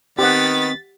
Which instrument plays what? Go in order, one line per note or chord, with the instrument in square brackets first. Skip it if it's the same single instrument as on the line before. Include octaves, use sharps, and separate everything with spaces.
[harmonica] D#3 B3 [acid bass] C4 [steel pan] G4 F#5 [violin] A6 B6